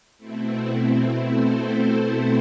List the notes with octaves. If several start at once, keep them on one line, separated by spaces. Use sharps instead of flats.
B2 A3 C4 E4
A4 C5